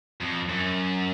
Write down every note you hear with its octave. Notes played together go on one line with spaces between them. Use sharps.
F2
F#2